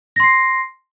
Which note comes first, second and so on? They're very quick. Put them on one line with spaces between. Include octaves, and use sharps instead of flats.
A#6 C6 C7